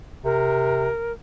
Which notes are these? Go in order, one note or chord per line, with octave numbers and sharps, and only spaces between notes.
C3 A#4